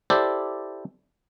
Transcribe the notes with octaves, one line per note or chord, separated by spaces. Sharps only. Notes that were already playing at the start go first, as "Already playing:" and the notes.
E4 G4 A4 C5 D5